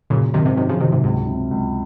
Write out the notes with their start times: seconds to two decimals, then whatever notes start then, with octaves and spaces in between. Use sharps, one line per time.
0.10 F#2 A#2 C#3
0.34 F#2 C3 D#3
0.45 G#2 C3
0.57 F#2 C3 D#3
0.69 C#3 F3
0.80 F#2 C3 D#3
0.92 G#2 C3
1.04 C#2 G#2
1.27 C3
1.51 C#2